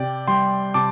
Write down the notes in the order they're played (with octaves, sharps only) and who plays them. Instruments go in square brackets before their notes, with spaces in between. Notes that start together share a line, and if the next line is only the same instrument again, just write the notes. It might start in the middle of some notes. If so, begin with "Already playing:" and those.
Already playing: [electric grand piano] C3 D5 G5
G3 G5 C6
C3 A5 D6